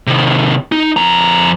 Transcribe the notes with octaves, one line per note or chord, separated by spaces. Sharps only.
C3 D#3
D#4
F2 A#5